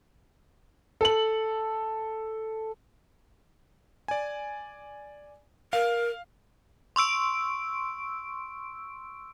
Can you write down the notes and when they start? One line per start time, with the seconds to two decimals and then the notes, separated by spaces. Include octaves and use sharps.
1.01 A4 F#7
4.08 D5 G#5
5.73 A#4 F5
6.96 C6 C#6 E6 D7